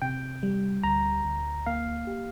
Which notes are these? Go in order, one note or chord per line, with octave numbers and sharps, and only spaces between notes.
C3 G5
G3
D2 A#5
D2
A#3 F5
G4